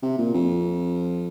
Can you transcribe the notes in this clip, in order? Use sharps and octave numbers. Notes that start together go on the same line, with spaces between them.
C3
A#2
F2